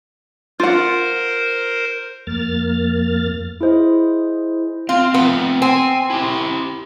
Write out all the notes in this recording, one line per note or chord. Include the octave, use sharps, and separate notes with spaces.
F4 A#4 C5 F#5
F2 A#3 F6 A6
E4 G#4 C5 D#5
C4 F4
A3 B3 C4 F4
C4 G#5
E4 G4